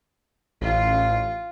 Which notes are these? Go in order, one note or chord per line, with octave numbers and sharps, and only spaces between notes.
A1 F4